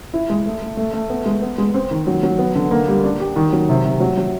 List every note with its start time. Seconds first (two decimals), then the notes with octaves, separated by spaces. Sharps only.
0.14 E4
0.30 G#3
0.46 A3
0.62 A3
0.77 A3
0.94 A3
1.10 B3
1.26 G#3
1.42 B3
1.58 G#3
1.74 C4
1.91 D#3
2.07 F#3
2.23 F#3
2.39 B3
2.55 D3
2.71 A#3
2.88 G3
3.04 D4
3.20 G4
3.36 D#3
3.53 F#3
3.69 C3
3.85 C3
4.00 F#3
4.17 F#3